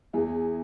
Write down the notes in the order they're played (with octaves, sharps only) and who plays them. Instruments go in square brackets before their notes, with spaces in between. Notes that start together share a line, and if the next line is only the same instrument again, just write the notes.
[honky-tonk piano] E2 E4 G#4